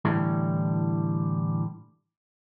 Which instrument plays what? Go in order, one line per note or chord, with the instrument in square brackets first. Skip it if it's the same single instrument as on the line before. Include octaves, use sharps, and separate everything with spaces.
[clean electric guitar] A2 D3 E3 G3